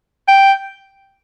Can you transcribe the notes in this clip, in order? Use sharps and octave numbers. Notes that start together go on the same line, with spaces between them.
G5